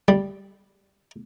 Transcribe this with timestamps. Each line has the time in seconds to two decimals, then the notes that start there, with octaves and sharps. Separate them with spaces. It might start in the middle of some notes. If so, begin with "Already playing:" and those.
0.08 G3